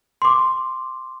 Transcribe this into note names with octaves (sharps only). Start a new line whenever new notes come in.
C6 D6